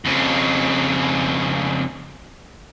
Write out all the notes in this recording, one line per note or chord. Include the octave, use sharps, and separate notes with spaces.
F2 C#3